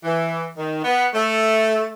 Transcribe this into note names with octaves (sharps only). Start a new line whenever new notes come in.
E3
D#3
B3
A3